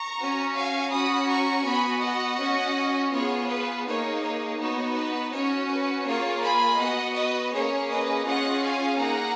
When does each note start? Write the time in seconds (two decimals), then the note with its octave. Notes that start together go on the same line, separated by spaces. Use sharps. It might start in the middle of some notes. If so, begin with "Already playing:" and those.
Already playing: A#5 C#6
0.19 C#4 F#4
0.55 F5 G#5
0.92 C#4 F#4 B5 D#6
1.28 A#5 C#6
1.64 B3 F#4 G#5 B5
2.01 D#5 F#5
2.38 C#4
2.43 F#4
3.12 B3 F4 G#4 C#5
3.48 B4
3.86 A#3 D#4 G#4 C#5
4.23 C#5
4.59 B3 D#4 F#4 C#5
4.95 B4
5.32 C#4 F#4 C#5
5.69 B4
6.06 A#3 F4 G#4 C#5
6.43 G#5 B5
6.79 B3 F#4 D#5 F#5
7.15 B4 D#5
7.52 A#3 C#4 G#4 C#5
7.90 B4 D#5
8.26 C#4 F4 G#4 D#5 F#5
8.63 F5 G#5
8.99 A#3 D#4 G#4 F#5 A#5